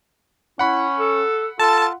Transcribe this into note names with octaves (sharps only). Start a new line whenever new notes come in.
C#4 E4 F#5 B5
A4
F4 A4 A5